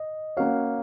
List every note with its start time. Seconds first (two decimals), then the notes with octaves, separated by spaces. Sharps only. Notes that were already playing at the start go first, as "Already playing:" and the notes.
Already playing: D#5
0.37 A#3 C#4 F#4 C#5 F5